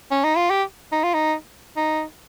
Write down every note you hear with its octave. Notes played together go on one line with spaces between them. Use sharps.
C#4
D#4
F4
G4
D#4
F4
D#4
D#4